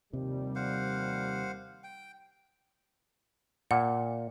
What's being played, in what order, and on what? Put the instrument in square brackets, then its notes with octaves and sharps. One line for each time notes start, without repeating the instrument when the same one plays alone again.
[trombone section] D#2 F3 G3 [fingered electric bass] C3
[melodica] C5 F5 F#5
G5
[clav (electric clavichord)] A#2 [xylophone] F#5